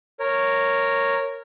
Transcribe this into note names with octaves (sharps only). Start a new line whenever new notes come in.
A#4 C#5